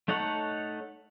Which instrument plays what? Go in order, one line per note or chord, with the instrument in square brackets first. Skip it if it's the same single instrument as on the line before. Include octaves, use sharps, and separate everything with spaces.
[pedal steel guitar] A3 D#4 A4 C#5 F#5